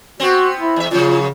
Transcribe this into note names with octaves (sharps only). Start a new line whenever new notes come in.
B3 C4 F#4
E4
E2 E5
F#2 C#3 F3 F4